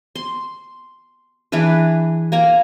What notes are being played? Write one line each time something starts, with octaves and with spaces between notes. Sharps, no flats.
C6
E3 D4 G#4 B4
A#3 G#5 A#5